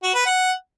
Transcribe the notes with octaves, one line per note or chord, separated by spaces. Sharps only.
F#4
B4
F#5